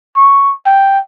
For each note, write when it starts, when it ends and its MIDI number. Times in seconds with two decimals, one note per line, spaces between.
0.16 0.51 85
0.66 0.99 79